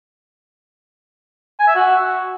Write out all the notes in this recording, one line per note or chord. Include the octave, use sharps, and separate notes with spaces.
G#5
E5
F#4